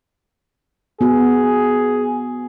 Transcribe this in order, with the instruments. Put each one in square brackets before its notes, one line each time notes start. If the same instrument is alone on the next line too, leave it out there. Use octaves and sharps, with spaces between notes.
[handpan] B3 F#4 [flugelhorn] G#4